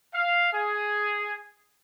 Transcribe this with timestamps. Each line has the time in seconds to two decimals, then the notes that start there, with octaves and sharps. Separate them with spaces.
0.14 F5
0.53 G#4